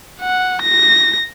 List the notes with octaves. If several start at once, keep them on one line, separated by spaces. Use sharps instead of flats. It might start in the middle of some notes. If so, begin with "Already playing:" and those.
F#5
A#6